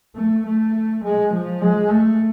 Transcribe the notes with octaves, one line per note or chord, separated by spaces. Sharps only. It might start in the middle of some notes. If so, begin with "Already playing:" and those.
A3
A3
G#3
F3
G#3
A3